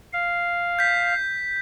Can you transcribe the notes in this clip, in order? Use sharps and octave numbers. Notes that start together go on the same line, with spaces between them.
F5
G6 B6